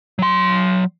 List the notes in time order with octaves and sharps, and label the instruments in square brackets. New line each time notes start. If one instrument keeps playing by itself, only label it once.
[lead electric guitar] F#3 C6